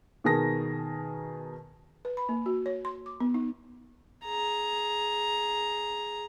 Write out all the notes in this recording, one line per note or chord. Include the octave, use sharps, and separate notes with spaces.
B2 D#3 G#4 A#4 A5 A#6
B4
B5
A#3
F#4
C#5
C6
D6
B3
D#4
G#4 A#5